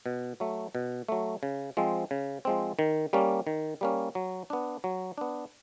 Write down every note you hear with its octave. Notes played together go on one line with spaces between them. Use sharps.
B2
F#3 A3
B2
F#3 A3
C#3
F3 G#3 C4
C#3
F3 G#3 C4
D#3
G3 A#3 C#4
D#3
G3 A#3 C#4
F#3
B3 D4
F#3
B3 D4